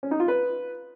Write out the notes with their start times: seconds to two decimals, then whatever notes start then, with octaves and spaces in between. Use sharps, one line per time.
0.03 C#4
0.11 D#4
0.20 F4
0.28 B4